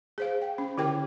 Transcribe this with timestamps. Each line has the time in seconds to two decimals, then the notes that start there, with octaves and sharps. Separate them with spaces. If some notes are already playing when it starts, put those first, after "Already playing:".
0.18 G#4 C5 F5
0.42 G5
0.58 C#4
0.77 D3 E4 G4 A#4 G5